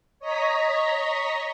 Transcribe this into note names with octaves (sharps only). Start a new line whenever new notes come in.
C#5 D#5 A#5 B6